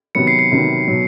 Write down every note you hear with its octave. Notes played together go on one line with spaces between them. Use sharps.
C3 D#3 F#3 B3 C#7
C7
C7
C3 D#3 F#3 B3
B2 F#3